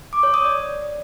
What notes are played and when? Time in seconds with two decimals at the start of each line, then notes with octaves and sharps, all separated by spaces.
0.13 D6
0.23 C#5
0.34 D#6
0.44 D5